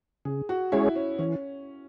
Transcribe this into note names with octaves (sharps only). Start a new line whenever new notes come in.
C#3 G#4
F#4
G#3 C#4 E4 G#4 C#5
C#4
E3 C#4